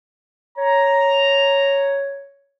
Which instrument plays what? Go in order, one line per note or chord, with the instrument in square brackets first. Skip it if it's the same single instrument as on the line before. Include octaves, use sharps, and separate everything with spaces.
[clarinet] C#5 [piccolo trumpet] A#5